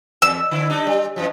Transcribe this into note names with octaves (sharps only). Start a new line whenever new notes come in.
E2 E6
D3 E4
G3 D4 D#4
G3
F2 E3 F3